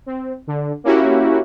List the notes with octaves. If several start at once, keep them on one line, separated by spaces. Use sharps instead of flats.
C4
D3
A#3 C#4 E4 F#4 G4